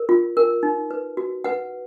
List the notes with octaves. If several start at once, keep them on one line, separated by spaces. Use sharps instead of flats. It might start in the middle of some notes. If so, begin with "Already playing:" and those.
Already playing: A#4
F4
A#4
D#4
B4
F#4
B4 F#5